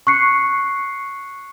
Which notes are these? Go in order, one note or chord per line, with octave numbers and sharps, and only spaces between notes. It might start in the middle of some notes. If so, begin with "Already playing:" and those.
C#6 F#6 C7 C#7